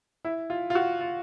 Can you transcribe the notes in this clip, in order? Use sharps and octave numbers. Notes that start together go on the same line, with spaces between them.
E4
F4
F4
F#4
F4